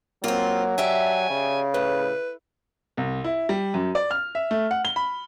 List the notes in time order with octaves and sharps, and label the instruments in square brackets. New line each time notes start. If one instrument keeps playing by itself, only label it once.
[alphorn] F#3 [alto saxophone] A#3 [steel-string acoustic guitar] C4 F4
[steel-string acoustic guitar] D4 G4 E5 [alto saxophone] G#5
[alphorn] C#3
[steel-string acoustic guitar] A2 [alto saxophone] B4
[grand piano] C2
E4
G3
F#2
D5
F6
E5
A3
F#5
G7
B5